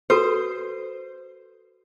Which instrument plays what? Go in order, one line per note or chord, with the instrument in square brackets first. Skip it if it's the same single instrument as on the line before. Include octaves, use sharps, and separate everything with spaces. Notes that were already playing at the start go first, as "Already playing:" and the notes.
[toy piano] F#4 A4 B4 [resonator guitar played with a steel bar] C5